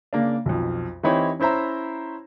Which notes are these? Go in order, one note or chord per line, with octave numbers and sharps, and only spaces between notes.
C#3 A#3 D4
B1 F2
E3 C4 D#4 E4 G4 C#5
C#4 E4 C5 E5 A#5